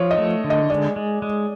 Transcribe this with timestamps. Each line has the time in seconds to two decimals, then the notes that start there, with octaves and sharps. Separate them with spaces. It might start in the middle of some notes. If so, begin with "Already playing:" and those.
Already playing: F3 C#5
0.11 D#5
0.18 A3
0.44 D3
0.50 D#5
0.70 G#3 D5
0.96 G#3
1.22 G#3